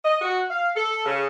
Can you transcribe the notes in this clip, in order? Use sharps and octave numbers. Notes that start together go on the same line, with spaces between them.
D#5
F#4
F5
A4
C#3